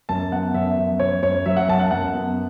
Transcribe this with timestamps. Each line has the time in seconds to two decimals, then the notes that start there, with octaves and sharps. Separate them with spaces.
0.09 F#2 A5
0.32 B3 F#5
0.54 F#2 E5
0.77 F#2
0.99 F#2 C#5
1.22 F#2 C#5
1.46 F#3 E5
1.57 F#5
1.68 F#2 A5
1.80 F#5
1.91 F#2 F#5
2.14 B3